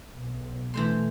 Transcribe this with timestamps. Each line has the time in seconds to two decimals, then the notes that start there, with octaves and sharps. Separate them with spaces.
0.16 B1
0.74 E3 A3 C5 C6